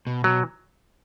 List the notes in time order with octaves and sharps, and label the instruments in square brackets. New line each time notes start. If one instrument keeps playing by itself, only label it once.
[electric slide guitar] B2
[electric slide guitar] B2 [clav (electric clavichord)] F#3